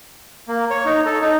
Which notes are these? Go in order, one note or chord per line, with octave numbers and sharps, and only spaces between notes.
A#3
C#5
D#4
A4
D#4